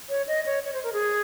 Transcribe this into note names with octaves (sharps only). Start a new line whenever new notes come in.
C#5
D#5
C#5
C#5
C5
A#4
G#4